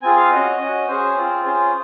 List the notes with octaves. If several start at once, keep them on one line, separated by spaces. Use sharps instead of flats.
C4 F4 G#4 G#5
F5
C#4 F#4 D#5
C#4 F#4
C#4 G#4 C5
C4 F4 G#4
C#4 F4 G#4 C5